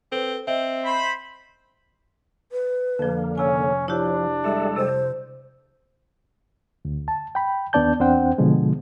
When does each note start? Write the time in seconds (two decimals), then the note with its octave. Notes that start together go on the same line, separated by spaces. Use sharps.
0.12 C4 A4 B4
0.47 C4 D#5 E5
0.85 C5 B5
2.52 B4
2.99 F2 D3 F3 A#3
3.38 C3 C#4 C#5 G#5
3.88 F3 D4 E4 G4
4.44 G3 G#3 A4 E5
4.76 C3 C5
6.85 D2
7.08 A5
7.35 G5 B5
7.73 D#2 B3 D4 D5 A5 G6
8.00 E2 C4 D4 C5 F#5 G5
8.38 B2 D3 F3 G#3